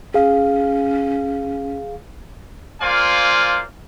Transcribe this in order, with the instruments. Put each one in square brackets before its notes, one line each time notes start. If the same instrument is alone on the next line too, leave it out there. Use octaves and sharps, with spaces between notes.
[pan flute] C#4 [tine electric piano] G#4 F5
[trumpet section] A#3 F4 C5 D5 F5 G#5